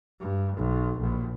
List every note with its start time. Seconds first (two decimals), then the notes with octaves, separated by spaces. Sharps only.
0.20 G2
0.56 B1
0.98 A#1